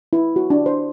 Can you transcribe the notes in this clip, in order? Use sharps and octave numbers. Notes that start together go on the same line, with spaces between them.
E4
F#4
D4
C5